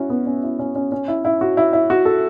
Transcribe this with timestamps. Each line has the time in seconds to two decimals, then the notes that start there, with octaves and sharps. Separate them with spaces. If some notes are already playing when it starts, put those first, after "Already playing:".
Already playing: C#4 E4 F#4
0.10 B3
0.26 C#4
0.43 E4
0.59 C#4
0.75 C#4
0.92 C#4
1.08 E4
1.25 E4
1.41 F#4
1.57 E4
1.73 E4
1.90 F#4
2.05 A4